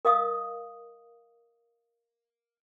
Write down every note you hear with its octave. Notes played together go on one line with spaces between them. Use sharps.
A#4 D#5 F5 D#6